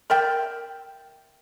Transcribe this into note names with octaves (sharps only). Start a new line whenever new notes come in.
A#4 D5 E5 G5